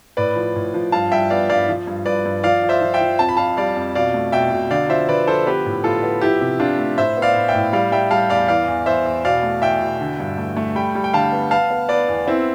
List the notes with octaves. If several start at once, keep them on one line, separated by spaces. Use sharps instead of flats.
A2 B4 D5
F3
A2
F3
G2 F5 A5
G2 E5 G5
B3 D5 F5
G2 D5 F5
F3
G2
G2 B4 D5
G2
F3 D5 F5
F3
C5 E5
F3
E5 G5
F3
F2 A5
B5
F2 F5 A5
G3 D5 F5
F2
B2 D5 F5
A3
B2 E5 G5
B2
D3 D5 F5
F3 C5 E5
D3 B4 D5
F3 A4 C5
B3 G4 B4
A2
A2 F4 A4
B3
F3 E4 G4
C3
C3 D4 F4
A3
A2 C5 E5
B3
D5 F5
A2
E5 G5
A2
G3 D5 F5
G3 E5 G5
G3 F5 A5
E2 D5 F5
E3 D5 F5
E2
E2 C5 E5
E2
B2 D5 F5
A3
E2 E5 G5
B2
D3
G2
A3
A3
G3 G5 B5
G3
G5
D3 F5 A5
B3
B3 F5 A5
B3
B3 B4 D5
E2
B3 C4 E4